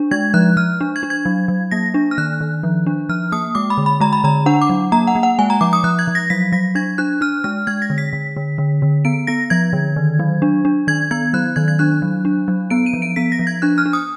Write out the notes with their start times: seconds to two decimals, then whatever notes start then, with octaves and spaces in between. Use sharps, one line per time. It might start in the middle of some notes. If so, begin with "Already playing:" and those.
Already playing: D4
0.11 G#3 G#6
0.34 F3 F#6
0.57 F3 F6
0.81 D4
0.96 G#6
1.03 D4
1.10 G#6
1.26 F#3
1.48 F#3
1.71 A#3 A#6
1.94 D4
2.11 F6
2.18 D#3 F#6
2.41 D#3
2.63 F3
2.86 D4
3.09 F3 F6
3.32 A#3 D#6
3.55 G#3 D6
3.70 B5
3.78 D3
3.86 B5
4.00 G#3 A#5
4.13 B5
4.24 D3 A#5
4.46 D4 F#5
4.61 D6
4.69 F#3
4.92 A#3 A#5
5.07 F#5
5.15 A#3
5.23 F#5
5.39 G#3 G#5
5.50 A#5
5.61 F3 D6
5.73 D#6
5.84 F3 F#6
5.99 G#6
6.07 F3
6.15 A#6
6.30 F#3 B6
6.52 F#3 A#6
6.75 D4 G#6
6.98 D4 F#6
7.21 D4 F6
7.44 G#3 F6
7.67 G#3 G#6
7.82 A#6
7.90 D3
7.98 B6
8.13 D3
8.37 D3
8.58 D3
8.82 D3
9.05 B3 D7
9.27 B3 A#6
9.50 F3 G#6
9.73 D3
9.96 D#3
10.19 F#3
10.42 D4
10.65 D4
10.88 D#3 G#6
11.11 B3 G#6
11.33 F#3 F#6
11.56 D#3 G#6
11.68 G#6
11.79 D4 F#6
12.02 F#3
12.25 D4
12.48 F#3
12.70 B3 D7
12.86 D#7
12.93 F3
13.02 D7
13.16 B3 B6
13.32 A#6
13.39 F3
13.47 G#6
13.62 D4 F#6
13.78 F6
13.86 D4
13.93 D#6